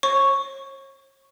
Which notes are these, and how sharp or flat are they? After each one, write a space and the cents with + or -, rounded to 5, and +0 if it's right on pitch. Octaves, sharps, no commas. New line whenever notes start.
C#5 -40 C#6 +0